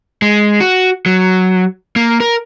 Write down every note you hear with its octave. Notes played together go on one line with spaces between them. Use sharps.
G#3
F#4
F#3
A#3
A#4